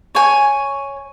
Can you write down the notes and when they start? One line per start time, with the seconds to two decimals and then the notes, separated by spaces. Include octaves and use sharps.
0.15 C#5 G#5